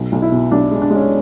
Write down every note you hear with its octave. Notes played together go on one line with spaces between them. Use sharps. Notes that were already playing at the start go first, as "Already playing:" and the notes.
Already playing: B1
B1
E4
B2
B1 D4
G#3
D4
G#3 C#4